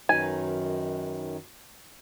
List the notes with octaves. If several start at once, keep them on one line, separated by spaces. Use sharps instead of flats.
F#2 D#3 F#3 D#4 B4 G#5